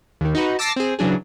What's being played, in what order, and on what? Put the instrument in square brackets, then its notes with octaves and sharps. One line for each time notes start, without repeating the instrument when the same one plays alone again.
[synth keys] D#2 D#3
D#4 F#4 B4
A5 D6 E6 A6 A#6 C7
C4 G#4
C#3 E3 F#3 D4 G#4